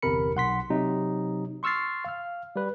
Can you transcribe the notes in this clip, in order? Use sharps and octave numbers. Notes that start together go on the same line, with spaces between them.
G1 E2 C3 A#4 B5 C#7
B1 F#5 C6 B6
C3 F#3 D#4
C6 C#6 E6 F6 A6 C7
F5 F6
G3 B4